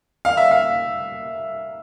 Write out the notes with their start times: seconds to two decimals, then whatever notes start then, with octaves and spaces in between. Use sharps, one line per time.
0.25 F5
0.37 E5
0.51 F5